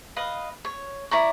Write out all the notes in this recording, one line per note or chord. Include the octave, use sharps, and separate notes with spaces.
B4 D#5 F5
C#5
E4 D5 A#5 C#6